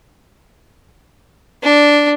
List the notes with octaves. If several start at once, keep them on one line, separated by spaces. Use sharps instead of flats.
D4